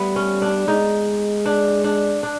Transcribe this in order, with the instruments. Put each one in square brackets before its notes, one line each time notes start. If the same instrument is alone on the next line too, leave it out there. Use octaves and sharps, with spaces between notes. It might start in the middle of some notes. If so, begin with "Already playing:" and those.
Already playing: [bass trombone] G3 [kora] A3 B3
[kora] C#4
D4
[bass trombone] G#3 [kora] D#4
[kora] D4
D4
D4